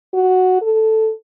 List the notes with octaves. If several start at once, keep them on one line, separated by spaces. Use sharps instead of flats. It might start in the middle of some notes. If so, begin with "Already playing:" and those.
F#4
A4